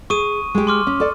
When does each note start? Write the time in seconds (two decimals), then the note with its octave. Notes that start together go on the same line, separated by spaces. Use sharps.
0.10 G#4 C#6 D#6 D#7
0.55 G#3 G4
0.67 C6 D6 F6
0.87 C#4
1.00 A4 D5